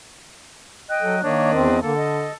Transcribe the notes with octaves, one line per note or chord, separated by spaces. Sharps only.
D#5 G5 F#6
F#3 A4
D#3 A#3 D4 C#5 D#5
E2 C4
D3 A#3 A4
D#5